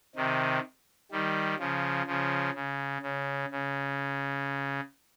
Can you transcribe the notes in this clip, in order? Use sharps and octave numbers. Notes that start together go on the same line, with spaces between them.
C3 D#3
D#3 G3
C#3 F3
C#3 F3
C#3
C#3
C#3